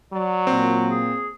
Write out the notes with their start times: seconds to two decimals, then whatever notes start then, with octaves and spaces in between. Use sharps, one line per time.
0.13 F#3 D5
0.47 A#2 C4
0.90 G#4